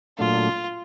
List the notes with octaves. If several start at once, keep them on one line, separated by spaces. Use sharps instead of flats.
A#2 F#3 A3 D4 F4